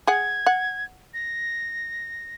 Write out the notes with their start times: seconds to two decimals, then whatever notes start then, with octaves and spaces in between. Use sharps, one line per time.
0.07 G#4 F#5 G#6
0.46 F#5
1.14 A#6